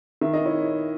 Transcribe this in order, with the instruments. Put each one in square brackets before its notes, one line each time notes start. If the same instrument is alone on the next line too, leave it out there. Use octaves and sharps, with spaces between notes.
[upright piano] D#3 E5
D#5
E4 C#5